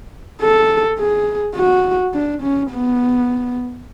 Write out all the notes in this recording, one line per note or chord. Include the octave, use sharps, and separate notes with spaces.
A4
G#4
F#4
D4
C#4
B3